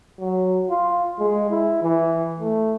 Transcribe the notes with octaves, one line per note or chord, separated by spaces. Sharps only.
F#3
F4
G#3
E4
E3
A3